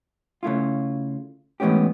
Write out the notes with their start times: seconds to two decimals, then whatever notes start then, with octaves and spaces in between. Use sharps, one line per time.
0.43 C#3 A3 E4 F4
1.60 G#2 E3 A3 B3 C#4 G4